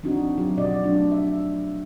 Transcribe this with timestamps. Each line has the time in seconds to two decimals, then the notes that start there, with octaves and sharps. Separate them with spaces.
0.03 F3 C4 D4 D#4 F#4
0.38 F#3 F4 G4
0.57 B2 F#4 D5 D#5
0.83 F#3 A3 D4 F4
1.12 E5